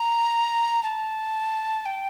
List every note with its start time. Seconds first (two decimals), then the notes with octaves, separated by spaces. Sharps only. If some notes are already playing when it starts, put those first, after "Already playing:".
Already playing: A#5
0.83 A5
1.86 G5